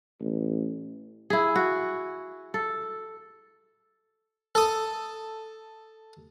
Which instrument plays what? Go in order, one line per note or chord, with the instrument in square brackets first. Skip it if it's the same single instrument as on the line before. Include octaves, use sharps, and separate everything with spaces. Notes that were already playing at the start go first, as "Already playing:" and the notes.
[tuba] A1
[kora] E4 G#4
F#4
A4
[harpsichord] A4 D#6